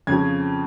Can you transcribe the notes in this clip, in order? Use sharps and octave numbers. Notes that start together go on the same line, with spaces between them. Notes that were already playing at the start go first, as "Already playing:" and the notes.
F2 C#3 F3 G#6